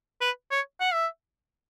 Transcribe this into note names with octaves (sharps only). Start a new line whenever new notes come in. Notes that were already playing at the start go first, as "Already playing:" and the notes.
B4
C#5
F#5
E5